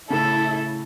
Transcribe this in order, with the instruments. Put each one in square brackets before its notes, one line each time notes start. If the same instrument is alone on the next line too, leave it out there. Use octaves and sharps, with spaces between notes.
[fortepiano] A2 C#3 [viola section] E4 [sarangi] A4